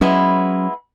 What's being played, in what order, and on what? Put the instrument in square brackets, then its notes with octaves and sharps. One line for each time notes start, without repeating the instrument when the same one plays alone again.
[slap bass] F#3 C#4 [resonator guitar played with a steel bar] G#3 B3 E4